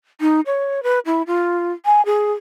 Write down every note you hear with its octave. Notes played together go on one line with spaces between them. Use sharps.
D#4
C#5
B4
E4
F4
G#5
G#4